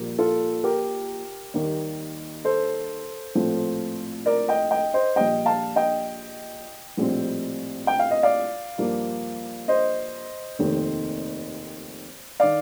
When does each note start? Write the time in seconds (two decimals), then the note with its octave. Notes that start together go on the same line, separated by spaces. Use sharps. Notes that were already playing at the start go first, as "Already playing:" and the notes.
Already playing: A#1 A#2 G3 A#3
0.18 F4 A4
0.64 G4 A#4
1.54 D#2 D#3 G3 A#3
2.45 A4 C5
3.35 A#1 A2 F3 A3 C4
4.26 A#4 D5
4.48 D#5 G5
4.71 D#5 G5
4.94 C5 D#5
5.16 A#1 A#2 G3 D#5 G5
5.46 F5 A5
5.76 D#5 G5
6.97 A#1 A2 G3 C4
7.87 G5
7.99 F5
8.11 D#5
8.23 D5 F5
8.78 G2 F3 A#3
9.68 C5 D#5
10.59 F1 D#2 D#3 A3 C4
12.40 D#3 D5 F5